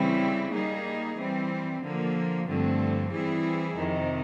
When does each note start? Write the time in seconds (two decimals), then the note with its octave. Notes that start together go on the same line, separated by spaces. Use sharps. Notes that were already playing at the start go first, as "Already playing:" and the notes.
Already playing: C#3 E3 G3 C4 E4
0.51 G3 A#3 D#4 G#4
1.16 E3 G3 C4
1.81 D3 F3 A#3
2.47 G2 D3 F3 A3 C4
3.11 E3 G3 C4 E4 G#4
3.77 F2 C3 D#3